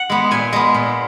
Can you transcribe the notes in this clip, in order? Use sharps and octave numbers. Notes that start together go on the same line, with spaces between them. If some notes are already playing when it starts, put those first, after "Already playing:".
Already playing: F#5
G#3 B3
A#2 G#5
G#3 B3
A#2